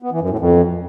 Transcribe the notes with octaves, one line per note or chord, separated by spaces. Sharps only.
B3
E3
F#2
A2
F2